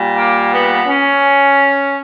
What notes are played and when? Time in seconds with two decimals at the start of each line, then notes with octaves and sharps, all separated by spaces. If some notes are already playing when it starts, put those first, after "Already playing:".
Already playing: A#2 G3
0.16 A#3
0.52 B3
0.88 C#4